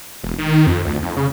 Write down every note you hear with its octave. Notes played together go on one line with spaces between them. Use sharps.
E1
D#3
F2
D2
F2
C#3